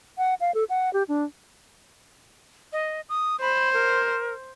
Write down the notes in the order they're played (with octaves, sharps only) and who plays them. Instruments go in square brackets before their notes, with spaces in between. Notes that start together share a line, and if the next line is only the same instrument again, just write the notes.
[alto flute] F#5
F5
A4
F#5
G4
D4
[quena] D#5
D#6
[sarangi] C5 [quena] B5
[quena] A#4